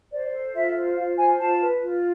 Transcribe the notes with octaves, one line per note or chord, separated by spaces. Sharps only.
C5 D5
A4
F4 E5
C5
F4 F5
C5 G#5
F4 A5
B4
F4